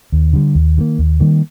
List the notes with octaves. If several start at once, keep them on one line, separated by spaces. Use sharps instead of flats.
D#2
D3 G3
D#2
D#3 G3 A#3
D#2
D#3 G3 A#3